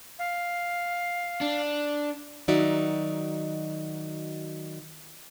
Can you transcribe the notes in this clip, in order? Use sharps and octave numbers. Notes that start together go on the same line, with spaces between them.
F5
D4
D#3 F#3 D#4 F#4 D5 E5